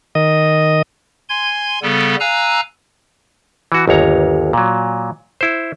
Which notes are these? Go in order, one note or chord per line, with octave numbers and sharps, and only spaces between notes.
D#3 D#5
G#5 C6 G#6
C#3 G3 B3 A4
F5 G#5 A#5 E6 F#6
E3 F#4
G1 D#2 C#5 A#5
A#2 F#3
E4 C5